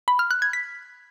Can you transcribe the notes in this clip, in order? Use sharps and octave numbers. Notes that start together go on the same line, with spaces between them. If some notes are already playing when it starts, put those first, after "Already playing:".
B5
F6
F#6
G#6
B6